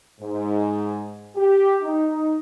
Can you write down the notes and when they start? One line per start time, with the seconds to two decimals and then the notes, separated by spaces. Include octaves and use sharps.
0.20 G#2
1.36 G4
1.82 D#4